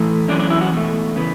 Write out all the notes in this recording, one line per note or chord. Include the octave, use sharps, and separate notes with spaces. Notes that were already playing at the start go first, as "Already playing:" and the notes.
Already playing: A2 E3 A3
F#2 E3 C#4 D4
D4
E4
F#4
E2 B2 A3
C#3 E3 B3